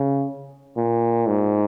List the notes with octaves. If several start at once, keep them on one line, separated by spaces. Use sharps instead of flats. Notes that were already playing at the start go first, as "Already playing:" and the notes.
Already playing: C#3
A#2
G#2